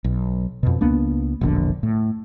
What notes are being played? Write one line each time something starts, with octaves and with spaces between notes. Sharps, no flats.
B1
F2 B2
C#2 A#3 B3 D4
E1 A#1 D3
A2